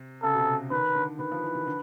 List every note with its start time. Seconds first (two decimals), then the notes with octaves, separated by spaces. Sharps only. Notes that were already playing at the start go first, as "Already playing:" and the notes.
Already playing: C3
0.23 C#3 A4
0.34 B2
0.39 C3
0.71 D#3 B4
0.96 D3
1.19 D#3 B4
1.32 F3
1.44 E3
1.55 D#3
1.67 D3